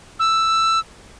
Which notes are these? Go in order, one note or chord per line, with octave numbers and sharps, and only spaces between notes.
E6